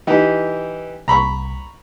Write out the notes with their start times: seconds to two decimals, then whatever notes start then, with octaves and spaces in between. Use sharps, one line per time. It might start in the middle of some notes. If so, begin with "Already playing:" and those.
0.07 E3 D#4 G4
1.08 C2 A#5 B5 C#6